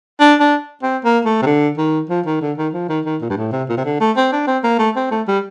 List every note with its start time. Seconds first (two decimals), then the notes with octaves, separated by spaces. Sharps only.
0.20 D4
0.40 D4
0.82 C4
1.04 A#3
1.25 A3
1.42 C3
1.46 D3
1.78 D#3
2.09 F3
2.26 D#3
2.41 D3
2.57 D#3
2.73 F3
2.89 D#3
3.05 D#3
3.21 A#2
3.30 G2
3.37 A2
3.52 C3
3.69 A#2
3.77 C3
3.85 D3
4.00 A3
4.17 C4
4.32 D4
4.47 C4
4.63 A#3
4.79 A3
4.96 C4
5.11 A3
5.27 G3